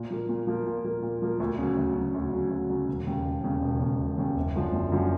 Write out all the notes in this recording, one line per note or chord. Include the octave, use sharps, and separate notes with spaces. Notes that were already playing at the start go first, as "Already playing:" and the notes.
Already playing: A#2
F3 A#3
A#2
F3 A#3
A#2
F3 A#3
A#2
F3 A#3
D2
C#3 F#3
D2
C#3 F#3
D2
C#3 F#3
D2
C#3 F#3
E1
D#2 C#3
E1
D#2 C#3
E1
D#2 C#3
E1
D#2 C#3
F#1
F#2 D3 F3
F#1
F#2 D3 F3